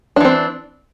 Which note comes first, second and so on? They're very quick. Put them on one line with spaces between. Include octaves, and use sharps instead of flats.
D4 E3 C4